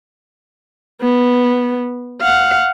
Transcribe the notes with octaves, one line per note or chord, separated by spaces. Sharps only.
B3
F5 F#5